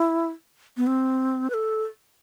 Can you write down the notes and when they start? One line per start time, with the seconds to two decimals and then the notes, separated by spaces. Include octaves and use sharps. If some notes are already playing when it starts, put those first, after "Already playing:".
Already playing: E4
0.77 B3
0.87 C4
1.50 B4
1.54 A4